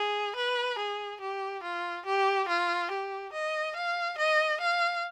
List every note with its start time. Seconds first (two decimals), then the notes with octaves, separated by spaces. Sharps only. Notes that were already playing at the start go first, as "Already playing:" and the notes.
Already playing: G#4
0.36 B4
0.79 G#4
1.21 G4
1.63 F4
2.06 G4
2.48 F4
2.91 G4
3.33 D#5
3.76 F5
4.18 D#5
4.61 F5